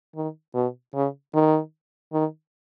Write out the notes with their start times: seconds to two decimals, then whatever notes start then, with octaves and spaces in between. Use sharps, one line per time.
0.15 D#3
0.54 B2
0.94 C#3
1.34 D#3
2.13 D#3